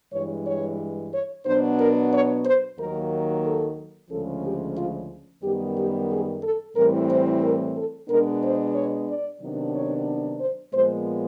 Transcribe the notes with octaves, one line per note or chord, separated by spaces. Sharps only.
G2 E3 G#3 C#5
C#5
C#5
B2 F#3 B3 D4 C5
A#4
C#5
C5
D#2 D#3 F#3 A#3 A#4
A4
D2 C#3 F3 G#3 C#4 A4
G4
F4
F#2 D#3 G3 B3 G4
G4
G#4
A4
A2 E3 G3 C4 A#4
C5
A#4
A4
B2 G#3 B3 D4 A#4
C5
C#5
D5
C3 D#3 F#3 B3 D4
C#5
C5
A#2 F3 G#3 B3 C5